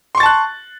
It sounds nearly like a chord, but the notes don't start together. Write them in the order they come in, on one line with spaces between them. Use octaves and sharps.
C6 C#6 A6 A5 F#6